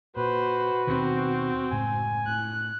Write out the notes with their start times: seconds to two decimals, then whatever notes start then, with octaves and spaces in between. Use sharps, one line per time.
0.16 A#2 F#4 B4 C5
0.87 D#2 B2 D#3 C4
1.71 F#1 A2 G#3 G#5
2.27 A2 F#6